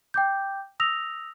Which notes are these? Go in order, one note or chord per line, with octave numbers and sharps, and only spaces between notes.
G5 D6 G6
D#6 E6 A#6 F7